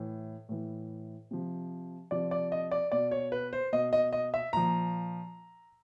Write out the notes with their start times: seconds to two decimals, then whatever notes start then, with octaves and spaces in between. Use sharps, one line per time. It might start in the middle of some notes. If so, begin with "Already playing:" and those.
Already playing: A2 E3
0.49 A2 E3
1.31 C3 F3
2.11 C3 F3 D5
2.31 D5
2.52 D#5
2.71 D5
2.92 B2 D5
3.11 C#5
3.32 B4
3.53 C5
3.72 B2 D#5
3.93 D#5
4.13 D#5
4.34 E5
4.53 A#2 F3 A#5